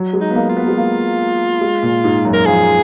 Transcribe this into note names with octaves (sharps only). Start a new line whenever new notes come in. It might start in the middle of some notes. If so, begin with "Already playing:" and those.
Already playing: F#3
G#3
D#4
B3
A#3
F4
B3
G#3
A#3
G#3
A#2
G#2
F#2
A#4
F3 G#4